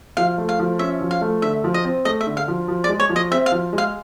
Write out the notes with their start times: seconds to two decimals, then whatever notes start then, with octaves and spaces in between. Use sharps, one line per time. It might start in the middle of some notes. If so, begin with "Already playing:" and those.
0.17 F3 F5
0.38 A3
0.49 F5
0.59 F3
0.79 C#4 E5
1.01 F3
1.11 F5
1.21 A3
1.42 D3 E5
1.64 F3
1.74 D#5
1.85 C4
2.05 A3 D#5
2.21 E5
2.27 D3
2.37 F5
2.48 F3
2.68 F3
2.84 D5
2.89 G#3
3.00 C#5
3.10 F3
3.16 D#5
3.31 C4 E5
3.46 F5
3.52 F3
3.73 G#3
3.78 F5